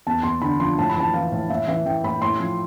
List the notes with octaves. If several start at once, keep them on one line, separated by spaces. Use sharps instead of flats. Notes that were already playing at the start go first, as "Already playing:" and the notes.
E2 A5
E2 C6
D3 B5
F3 C6
A2 A5
B5
E3 A5
E3 F5
A2
A2 E5
E3 E5
E3 G5
A2 B5
A2 C6
F3